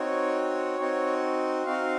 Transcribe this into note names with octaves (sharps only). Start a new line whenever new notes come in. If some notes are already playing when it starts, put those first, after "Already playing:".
Already playing: C4 D#4 F#4 C#5
C4 D#4 F#4
C4 D#4 F#4 F5